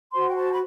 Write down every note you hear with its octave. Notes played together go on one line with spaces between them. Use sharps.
F#4 C5 C6
G5
A5
B5